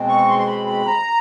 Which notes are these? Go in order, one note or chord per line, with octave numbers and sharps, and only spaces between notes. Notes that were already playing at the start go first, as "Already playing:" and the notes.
Already playing: B2 G#3 C4
C#6
C6
C6
B5
B5
A#5